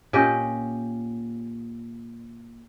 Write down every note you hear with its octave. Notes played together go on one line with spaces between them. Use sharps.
A#2 C#4 G4 D#5